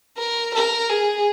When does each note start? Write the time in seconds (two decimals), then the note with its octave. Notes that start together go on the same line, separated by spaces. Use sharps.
0.18 A#4
0.54 A#4
0.90 G#4